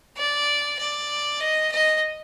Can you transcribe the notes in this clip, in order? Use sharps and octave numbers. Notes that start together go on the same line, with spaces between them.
D5
D5
D#5
D#5